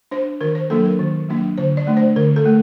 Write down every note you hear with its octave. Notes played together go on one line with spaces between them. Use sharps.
D4 C5
D#3 A#4
C5
F#3 A#3 D4 A4
A#4
D#3
F#3 A#3 D4
D3 C5
D5
A3 D4
C5
D3 A#4
A4
A3